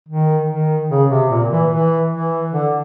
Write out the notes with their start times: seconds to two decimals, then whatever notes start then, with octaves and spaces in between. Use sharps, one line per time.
0.08 D#3
0.48 D#3
0.90 C#3
1.10 C3
1.29 A#2
1.51 E3
1.71 E3
2.11 E3
2.53 D3